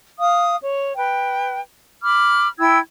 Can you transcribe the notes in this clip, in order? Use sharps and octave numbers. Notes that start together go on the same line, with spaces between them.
F5 D#6
C#5
B4 G5
B5 D6 F6
E4 G5 E6 G#6